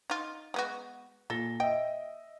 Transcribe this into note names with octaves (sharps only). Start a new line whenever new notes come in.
D#4 F4
G#3 B3 F#4
A#2 A4 A#6 G7
D#5 E5 G5